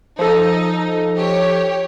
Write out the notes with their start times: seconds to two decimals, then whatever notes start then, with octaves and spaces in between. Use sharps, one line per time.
0.19 F3 D#4 A4
1.16 G4 C#5